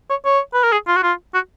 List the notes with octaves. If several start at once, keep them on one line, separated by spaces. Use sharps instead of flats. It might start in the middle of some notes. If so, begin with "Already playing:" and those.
C#5
C#5
B4
A#4
G#4
F4
F#4
F4
F#4